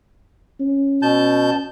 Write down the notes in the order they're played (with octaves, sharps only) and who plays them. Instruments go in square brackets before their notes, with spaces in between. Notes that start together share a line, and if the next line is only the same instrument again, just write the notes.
[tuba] C#4
[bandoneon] B2 A5 G6